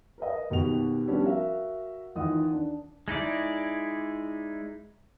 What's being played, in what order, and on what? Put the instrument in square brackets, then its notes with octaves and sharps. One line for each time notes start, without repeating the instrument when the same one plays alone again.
[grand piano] A#4 B4 D#5
D#2 B2 F#4 G4 F7
F3 G3 B3 C#4 D4 G4
F#4 A#4 E5 F5
D#2 E3 D#4 F4 F#5 D#6
D4
[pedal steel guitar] G#3 D#4 E4 D5